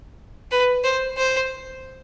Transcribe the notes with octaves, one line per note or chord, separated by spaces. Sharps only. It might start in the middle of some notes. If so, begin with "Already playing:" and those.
B4
C5
C5